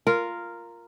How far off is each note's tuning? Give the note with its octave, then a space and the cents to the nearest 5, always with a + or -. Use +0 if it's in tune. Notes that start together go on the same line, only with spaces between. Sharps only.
F4 -5 A#4 -5